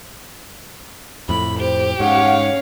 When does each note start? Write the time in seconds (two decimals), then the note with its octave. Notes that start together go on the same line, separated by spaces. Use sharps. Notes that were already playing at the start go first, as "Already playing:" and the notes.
1.29 F2 A2 B5
1.59 G4 C5
2.00 G#2 C#4 C#5 F5 F#5